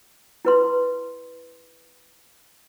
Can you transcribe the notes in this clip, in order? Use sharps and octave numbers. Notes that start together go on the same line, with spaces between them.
E4 B4 C6